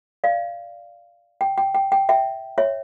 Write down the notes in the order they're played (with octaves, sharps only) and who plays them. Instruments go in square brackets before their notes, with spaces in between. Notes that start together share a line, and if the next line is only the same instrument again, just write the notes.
[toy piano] D5 F5
G5
G5
G5
G5
E5 G5
C#5 E5